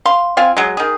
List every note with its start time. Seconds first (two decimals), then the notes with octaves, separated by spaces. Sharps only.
0.05 F5 C6
0.37 C4 F4 F5 G#5
0.57 F#3 G#3
0.77 D#3 G#4